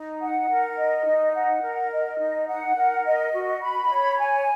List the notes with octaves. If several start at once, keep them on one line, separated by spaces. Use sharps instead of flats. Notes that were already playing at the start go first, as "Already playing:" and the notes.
Already playing: D#4
F#5
A#4
D#5
D#4
F#5
A#4
D#5
D#4
F#5
A#4
D#5
F#4
B5
C#5
G#5